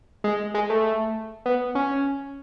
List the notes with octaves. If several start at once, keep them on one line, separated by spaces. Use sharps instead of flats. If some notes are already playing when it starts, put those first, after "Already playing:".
G#3
G#3
A3
B3
C#4